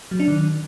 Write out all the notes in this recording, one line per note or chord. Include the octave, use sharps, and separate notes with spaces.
F#3
D4
D#3